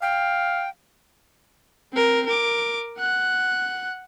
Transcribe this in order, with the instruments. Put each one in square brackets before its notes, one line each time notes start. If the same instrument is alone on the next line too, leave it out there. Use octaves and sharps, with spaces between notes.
[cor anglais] F5 [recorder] G5
[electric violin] C4 A#4
A#4 D6
F#5 F#6